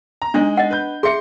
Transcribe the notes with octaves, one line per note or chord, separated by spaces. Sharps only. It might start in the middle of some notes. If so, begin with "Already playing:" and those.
A#5
G#3 D4 D#4
D#5 F#5
B4 G6
G#4 E5 C6 C#7